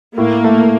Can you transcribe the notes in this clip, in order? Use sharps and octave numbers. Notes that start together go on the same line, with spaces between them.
A2 A#3
A3